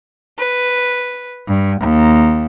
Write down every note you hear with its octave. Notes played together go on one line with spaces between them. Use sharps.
B4
G2
D#2